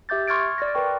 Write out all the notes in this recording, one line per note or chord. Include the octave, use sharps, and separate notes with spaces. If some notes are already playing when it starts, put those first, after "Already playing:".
G4 E5 D6 G6 A6
C6 C#6 F6 G#6 A6 D7
D5 F6 A#6
A#4 B4 G5 C#6